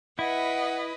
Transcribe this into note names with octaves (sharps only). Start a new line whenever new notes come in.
E4 B4 D#5 F#5